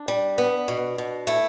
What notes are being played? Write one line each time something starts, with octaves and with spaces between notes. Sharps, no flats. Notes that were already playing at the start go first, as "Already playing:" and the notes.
Already playing: D4
G3
B3
B2
B2
A3 E4